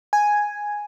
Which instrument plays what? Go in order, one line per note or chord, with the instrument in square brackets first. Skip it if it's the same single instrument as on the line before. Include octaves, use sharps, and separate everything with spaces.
[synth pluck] G#5